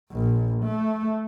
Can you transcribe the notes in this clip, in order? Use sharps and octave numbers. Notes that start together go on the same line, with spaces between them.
A#1
A3